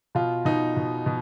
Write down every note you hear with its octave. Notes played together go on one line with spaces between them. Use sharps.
B2 F4
B2 D#4
B2
B2